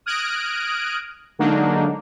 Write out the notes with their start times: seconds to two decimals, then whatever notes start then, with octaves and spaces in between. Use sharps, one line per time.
0.06 D#6 F6 F#6 G#6 A#6 D7
1.39 D3 F#3 G#3 A#3 D4 D#4